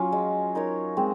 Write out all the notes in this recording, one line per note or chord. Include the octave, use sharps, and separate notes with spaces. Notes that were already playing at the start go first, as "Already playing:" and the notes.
Already playing: F#3 C#4 F4
G#3
D#4 A#4 C#5
G#3 C4